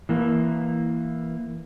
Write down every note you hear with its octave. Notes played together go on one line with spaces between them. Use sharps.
E3 A#3